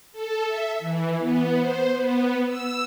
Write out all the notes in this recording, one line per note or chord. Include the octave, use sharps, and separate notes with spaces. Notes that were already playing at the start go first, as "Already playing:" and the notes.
A4
E5
E3
B3
C5
B3
E6